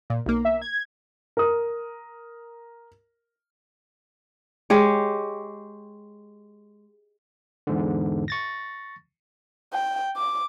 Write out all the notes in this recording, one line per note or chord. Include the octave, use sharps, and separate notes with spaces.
A#2
B1 A#3
E5
G#6
A#4 D#6
G#3 G4 C#5
E2 G#2 D3
C#6 A6 A#6
G5
D6